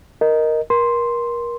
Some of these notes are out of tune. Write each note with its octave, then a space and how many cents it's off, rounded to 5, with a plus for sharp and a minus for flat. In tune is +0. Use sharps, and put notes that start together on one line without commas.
A#4 +0 D#5 +0
A#4 +30 C6 +0